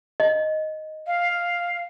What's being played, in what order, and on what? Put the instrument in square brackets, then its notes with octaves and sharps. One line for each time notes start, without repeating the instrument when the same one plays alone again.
[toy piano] D#5
[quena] F5